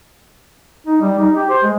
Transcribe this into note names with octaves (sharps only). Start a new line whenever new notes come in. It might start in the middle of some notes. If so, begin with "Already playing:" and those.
D#4
G3
D#4
G4
C5
G#3